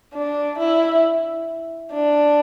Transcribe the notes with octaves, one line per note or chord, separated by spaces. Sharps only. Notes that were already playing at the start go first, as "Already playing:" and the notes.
D4
E4
D4